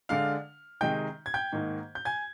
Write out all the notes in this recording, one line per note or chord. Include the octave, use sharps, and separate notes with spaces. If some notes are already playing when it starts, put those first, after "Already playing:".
D3 G#3 D4 F5 F6
C3 D#3 G#3 D#4 G5 G6
G#6
G5 G6
G#2 D#3 A#3 D#4
G6
G#5 G#6